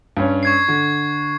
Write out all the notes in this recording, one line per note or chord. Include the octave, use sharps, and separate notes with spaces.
G2 C#4
C#6 G#6 C7
D3